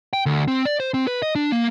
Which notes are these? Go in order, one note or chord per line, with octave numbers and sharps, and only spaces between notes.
G5
D2
C4
D5
C5
C4
B4
D#5
D4
A#3